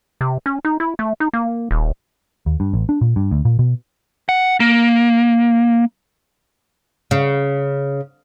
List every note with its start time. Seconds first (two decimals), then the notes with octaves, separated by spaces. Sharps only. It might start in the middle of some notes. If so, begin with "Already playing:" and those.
0.21 C3
0.46 C#4
0.65 D#4
0.80 E4
0.99 A3
1.20 D#4
1.33 A#3
1.71 D#1
2.46 D#2
2.60 G2
2.74 A1
2.89 D4
3.01 A#2
3.16 G2
3.31 D2
3.45 A#2
3.59 B2
4.29 F#5
4.60 A#3
7.11 C#3